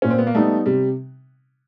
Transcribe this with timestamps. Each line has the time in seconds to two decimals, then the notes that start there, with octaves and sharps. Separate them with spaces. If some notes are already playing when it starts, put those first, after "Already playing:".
0.02 A#2 C#4
0.10 C4
0.18 B3
0.27 A#3
0.35 G3 A3 B3 D#4
0.66 C3 G3